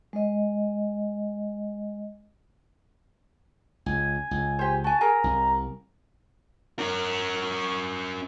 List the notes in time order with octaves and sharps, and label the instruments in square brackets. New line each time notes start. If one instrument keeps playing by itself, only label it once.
[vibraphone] G#3 D#5
[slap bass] C#2 [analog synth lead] G#5
[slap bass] C#2
[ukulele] G4 C5
[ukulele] F#4 G#5 [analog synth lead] A5
[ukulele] G#4 A#4 G#5 [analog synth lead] A#5
[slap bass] C2
[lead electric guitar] C#4 A#4